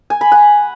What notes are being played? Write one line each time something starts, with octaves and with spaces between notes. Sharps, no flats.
G#5
B5
F#5